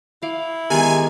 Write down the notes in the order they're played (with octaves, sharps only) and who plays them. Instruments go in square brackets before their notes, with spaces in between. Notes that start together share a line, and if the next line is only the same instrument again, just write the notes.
[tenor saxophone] E4 [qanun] F5 D6
[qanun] D#3 G#3 [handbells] B3 G4 A#5 [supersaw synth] G#5